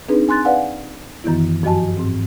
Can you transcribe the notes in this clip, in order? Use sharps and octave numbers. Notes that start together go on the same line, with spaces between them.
C4 D4 D#4 G#4 B4
G#5 C6 F#6 A6
B4 D5 F5 F#5 G#5
F#2 D#3 E3 B3 E4
G2 F3 F#4 D#5 G#5 A5
G#2 C4